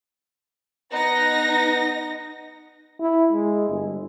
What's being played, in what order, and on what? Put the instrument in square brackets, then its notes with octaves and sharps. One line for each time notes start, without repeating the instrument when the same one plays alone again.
[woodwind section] B3 F#5 A#5 [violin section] D#4 A#6
[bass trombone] E4
G#3
G1